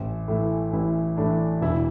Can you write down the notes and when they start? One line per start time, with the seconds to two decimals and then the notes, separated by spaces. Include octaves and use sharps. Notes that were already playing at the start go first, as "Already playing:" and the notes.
Already playing: A1
0.28 A2 E3
0.73 A1 E4
1.17 A2 E3 D4
1.61 E1 E4